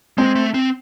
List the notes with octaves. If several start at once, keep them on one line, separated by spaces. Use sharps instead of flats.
G#3 C4
A3
C4